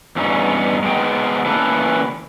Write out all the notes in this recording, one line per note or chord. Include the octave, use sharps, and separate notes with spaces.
E2 G2 C#4 D#4
G#3 B3 D#4 G5
C#3 E3 A#3 A4 B4